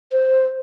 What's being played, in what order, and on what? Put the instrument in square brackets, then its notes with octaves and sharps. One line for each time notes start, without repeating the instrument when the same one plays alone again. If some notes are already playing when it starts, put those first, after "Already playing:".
[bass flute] C5